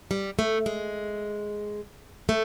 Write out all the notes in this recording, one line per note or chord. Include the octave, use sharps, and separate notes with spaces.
G3
A3
G#3
A3